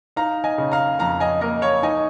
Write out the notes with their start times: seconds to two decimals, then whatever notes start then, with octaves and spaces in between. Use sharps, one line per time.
0.16 D#4 F5 A#5
0.44 D#5 G#5
0.58 C#3
0.72 F5 A#5
0.99 F2 F5 A#5
1.20 D#5 G#5
1.41 A#3 A#4 D#5
1.62 C#5 F5
1.82 D#4 D#5 G#5